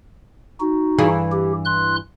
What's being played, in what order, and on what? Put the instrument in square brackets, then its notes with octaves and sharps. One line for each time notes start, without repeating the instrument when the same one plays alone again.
[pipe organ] D#4 F#4
[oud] G2 E3 G#4
[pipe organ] G4
C6 F#6